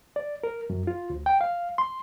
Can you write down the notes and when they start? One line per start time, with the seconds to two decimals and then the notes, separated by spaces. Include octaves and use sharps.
0.16 D5
0.44 A#4
0.70 F#2
0.87 F4
1.10 D2
1.26 G5
1.41 F5
1.78 C6